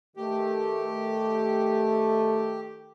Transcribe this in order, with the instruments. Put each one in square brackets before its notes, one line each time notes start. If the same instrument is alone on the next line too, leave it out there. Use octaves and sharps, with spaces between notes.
[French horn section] D#3 A3 [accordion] G4